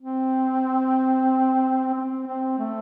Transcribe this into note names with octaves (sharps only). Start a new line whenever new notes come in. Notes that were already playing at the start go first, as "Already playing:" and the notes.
C4
C4
C4
A3